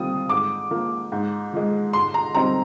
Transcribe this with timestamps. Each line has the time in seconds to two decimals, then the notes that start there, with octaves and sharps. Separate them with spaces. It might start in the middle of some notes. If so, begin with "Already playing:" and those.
Already playing: G3 C4 F4 D#6
0.29 G#2 D6
0.71 F3 A#3
1.12 G#2
1.53 F3 G#3
1.93 G#2 C6
2.14 A#5
2.35 G3 C4 D#4 A#5